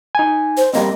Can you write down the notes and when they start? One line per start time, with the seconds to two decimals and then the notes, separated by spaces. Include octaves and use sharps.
0.15 D#4 G#5
0.57 C5
0.73 G3 A#3 C4 D#5